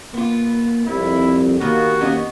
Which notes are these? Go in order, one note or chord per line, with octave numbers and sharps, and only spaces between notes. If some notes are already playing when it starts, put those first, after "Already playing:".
A#3 B3 F4
C2 F2 E4
D#2 D#3 A#3 B3 F#4
B3 C#4 D#5